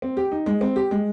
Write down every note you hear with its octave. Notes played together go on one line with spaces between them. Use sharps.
C4
G4
D#4
G#3
C4
G4
G#3